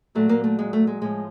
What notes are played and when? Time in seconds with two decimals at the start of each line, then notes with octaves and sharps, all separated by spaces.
0.15 A#2 F#3 A3
0.29 A#3
0.44 A3
0.59 G#3
0.73 A3
0.87 G#3
1.01 A2 F3 G#3